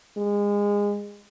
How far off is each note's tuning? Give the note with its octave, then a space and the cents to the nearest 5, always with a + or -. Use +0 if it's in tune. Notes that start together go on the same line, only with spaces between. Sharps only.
G#3 -25